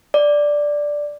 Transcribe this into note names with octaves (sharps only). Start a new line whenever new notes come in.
D5